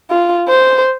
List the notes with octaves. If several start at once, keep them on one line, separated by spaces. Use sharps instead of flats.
F4
C5